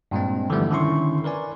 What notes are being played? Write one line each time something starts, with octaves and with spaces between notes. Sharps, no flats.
G2 A#2 G#3 C4
D3 E3 F3 G3 A3 B3
D3 D#3 C#4 E4 C6 C#6
A#4 B4 D5 G#5